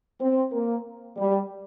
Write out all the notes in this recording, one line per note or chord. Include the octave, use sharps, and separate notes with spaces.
C4
A#3
G3